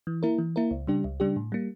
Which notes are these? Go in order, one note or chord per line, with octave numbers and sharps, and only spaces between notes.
E3
A#3 E4 A#4
E3
A#3 E4 A#4
C#2
C#3 G3 D4 G4
C#2
C#3 G3 D4 G4
A2
G3 A#3